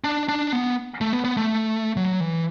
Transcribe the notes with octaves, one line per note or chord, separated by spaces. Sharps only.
D4
D4
B3
A3
B3
B3
A3
F#3
E3